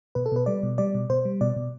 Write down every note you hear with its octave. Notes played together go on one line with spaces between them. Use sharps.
B2 B4
A4
B2 B4
G3 D5
B2
G3 D5
B2
B2 C5
G3
B2 D5
B2